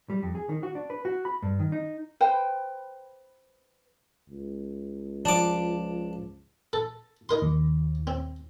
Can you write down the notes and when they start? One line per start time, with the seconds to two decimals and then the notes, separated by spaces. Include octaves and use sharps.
0.10 G3
0.23 F2
0.35 G#4
0.49 D#3
0.63 F#4
0.75 D4
0.90 B4
1.05 F#4
1.25 B5
1.42 G2
1.59 D#3
1.72 D#4
2.21 B4 C5 G5
4.29 C#2
5.25 F3 D4 D6
6.73 A4
7.29 D#4 A#4 C6
7.42 D#2
8.07 C4